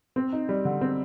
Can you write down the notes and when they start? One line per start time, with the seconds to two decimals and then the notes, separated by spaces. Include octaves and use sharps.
0.16 C4
0.33 D#4
0.49 G3
0.65 D3
0.81 C4